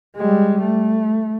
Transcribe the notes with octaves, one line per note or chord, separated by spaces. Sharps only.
G3 G#3
A3